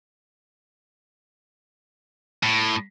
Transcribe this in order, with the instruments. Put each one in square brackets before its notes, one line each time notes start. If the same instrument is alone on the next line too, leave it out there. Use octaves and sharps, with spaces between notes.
[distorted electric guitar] A2